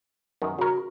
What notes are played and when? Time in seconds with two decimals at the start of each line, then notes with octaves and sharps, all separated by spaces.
0.42 F#2 D#3
0.59 C#3 F#4 A#4